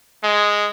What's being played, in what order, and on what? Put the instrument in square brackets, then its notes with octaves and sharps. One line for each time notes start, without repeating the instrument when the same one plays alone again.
[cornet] G#3